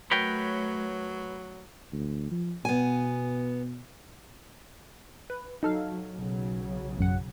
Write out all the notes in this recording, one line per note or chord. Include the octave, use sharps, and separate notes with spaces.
F#3 A3 A#4 B4 C#5 G5
D2
F3
B2 B3 G#5
B4
F#3 D#4 A4 F5
B1 C#3 F#3
A1 F#2 F#5